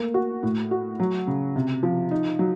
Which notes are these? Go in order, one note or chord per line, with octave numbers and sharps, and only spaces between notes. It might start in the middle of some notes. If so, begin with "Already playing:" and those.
Already playing: A3 A#3
F#4
A2
F#4
F#3
C#3
C3
F3
D#4
F#3